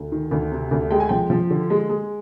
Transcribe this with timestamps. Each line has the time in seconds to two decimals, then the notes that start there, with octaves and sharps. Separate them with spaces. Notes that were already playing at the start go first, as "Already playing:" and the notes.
Already playing: D2
0.12 D#3
0.31 D2
0.52 C3
0.71 D2
0.91 G#3 G5
1.00 G#5
1.09 F3 G5
1.30 F3
1.50 D3
1.70 G#3
1.89 G#3